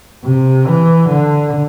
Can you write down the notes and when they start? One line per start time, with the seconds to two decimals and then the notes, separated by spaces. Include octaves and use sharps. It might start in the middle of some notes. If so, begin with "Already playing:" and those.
0.25 C3
0.67 E3
1.09 D3